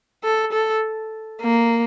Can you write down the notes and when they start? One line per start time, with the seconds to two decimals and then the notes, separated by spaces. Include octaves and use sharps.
0.24 A4
0.52 A4
1.41 A#3